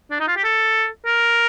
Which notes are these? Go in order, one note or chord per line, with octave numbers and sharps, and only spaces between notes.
D4
D#4
F4
G4
A4
A#4